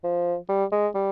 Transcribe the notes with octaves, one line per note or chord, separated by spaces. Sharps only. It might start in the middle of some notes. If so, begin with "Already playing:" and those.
F3
G3
G#3
G3